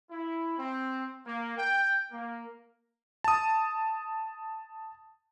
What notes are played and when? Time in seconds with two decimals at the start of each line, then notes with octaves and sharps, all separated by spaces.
0.11 E4
0.58 C4
1.26 A#3
1.58 G5
2.11 A#3
3.24 A5 D#6